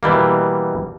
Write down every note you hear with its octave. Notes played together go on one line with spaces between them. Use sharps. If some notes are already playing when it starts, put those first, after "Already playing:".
B2 E3 G3 A#3